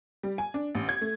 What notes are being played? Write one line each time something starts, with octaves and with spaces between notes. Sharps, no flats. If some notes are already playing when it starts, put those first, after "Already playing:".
G3
G#5
D4
A1
G#6
A3